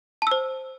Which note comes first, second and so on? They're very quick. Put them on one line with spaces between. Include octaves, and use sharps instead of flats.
A5 E6 C5